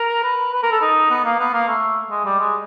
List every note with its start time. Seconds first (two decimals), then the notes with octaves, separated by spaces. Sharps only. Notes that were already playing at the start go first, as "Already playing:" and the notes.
Already playing: A#4
0.23 B4
0.53 B4
0.62 A#4
0.72 A4
0.81 D#4
1.10 B3
1.24 A#3
1.39 B3
1.53 A#3
1.68 A3
2.10 G#3
2.25 G3
2.39 G#3